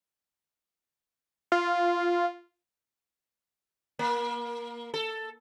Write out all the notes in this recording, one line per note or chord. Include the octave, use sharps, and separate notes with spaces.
F4
A#3
A4